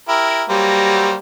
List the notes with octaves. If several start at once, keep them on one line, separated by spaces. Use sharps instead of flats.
E4 G4 A#4
F#3 G3 A#3 C5